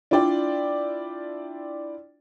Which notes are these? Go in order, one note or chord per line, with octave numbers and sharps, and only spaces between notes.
D4 E4 F4 D5 G5